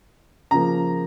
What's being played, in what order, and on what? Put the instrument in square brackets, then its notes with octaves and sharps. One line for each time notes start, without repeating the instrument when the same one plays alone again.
[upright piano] C#3 F3 A#3 A#5